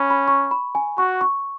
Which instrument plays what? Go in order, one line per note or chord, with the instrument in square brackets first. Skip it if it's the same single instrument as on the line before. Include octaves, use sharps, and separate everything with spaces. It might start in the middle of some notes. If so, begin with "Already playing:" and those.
Already playing: [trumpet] C#4 [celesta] B5 C#6
[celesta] B5
C#6
B5
G#5
[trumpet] F#4 [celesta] C#6
[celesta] C#6